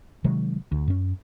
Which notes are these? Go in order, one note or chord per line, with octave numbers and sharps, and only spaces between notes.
C3 D#3 F#3 G#3
D2
F#2 C#4